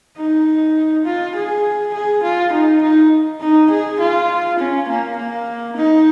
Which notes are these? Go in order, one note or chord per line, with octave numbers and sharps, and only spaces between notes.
D#4
F4
G#4
G#4
F4
D#4
D#4
D#4
G#4
F4
C#4
A#3
A#3
D#4